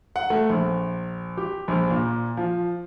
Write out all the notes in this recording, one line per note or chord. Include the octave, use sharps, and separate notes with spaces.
F#5
A3
A#1
G4
A#1
A#2
F3